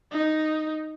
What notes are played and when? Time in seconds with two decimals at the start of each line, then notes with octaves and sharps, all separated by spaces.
0.12 D#4